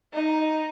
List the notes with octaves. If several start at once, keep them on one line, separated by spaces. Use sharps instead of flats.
D#4